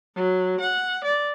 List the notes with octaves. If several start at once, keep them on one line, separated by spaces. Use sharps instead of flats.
F#3
F#5
D5